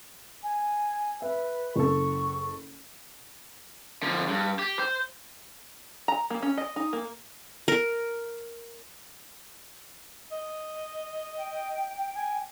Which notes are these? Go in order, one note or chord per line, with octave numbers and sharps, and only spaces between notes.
G#5
B4 E5
F#1 A4 C#6
D3 F3
G2
G4
C5
A#5
A#3
C#4
D#5
D#4
A#3
A#4
D#5
G5
G#5